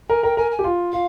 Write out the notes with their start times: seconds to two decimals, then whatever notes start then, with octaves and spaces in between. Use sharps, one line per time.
0.09 A#4 G#5
0.23 A#4 G5
0.37 A#4 G#5
0.51 G#5
0.59 G4
0.64 F4
0.92 F4 F5